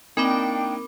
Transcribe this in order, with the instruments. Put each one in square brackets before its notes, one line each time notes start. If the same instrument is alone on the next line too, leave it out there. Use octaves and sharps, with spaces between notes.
[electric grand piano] A#3 D#4 [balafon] C4 [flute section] D4 G5 [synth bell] A#4 B5 D6